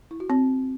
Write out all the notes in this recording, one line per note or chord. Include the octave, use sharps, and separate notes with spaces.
E4
F#4
C4